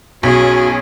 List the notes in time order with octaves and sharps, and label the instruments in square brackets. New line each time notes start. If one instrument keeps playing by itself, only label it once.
[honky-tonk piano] B1 [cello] C#4 G#4 [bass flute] F#4